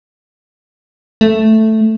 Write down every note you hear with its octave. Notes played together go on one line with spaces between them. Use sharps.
A3